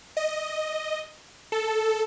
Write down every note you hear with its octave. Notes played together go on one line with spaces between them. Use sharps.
D#5
A4